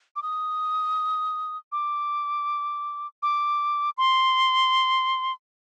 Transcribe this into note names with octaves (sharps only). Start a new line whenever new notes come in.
D6
D#6
D6
D6
C6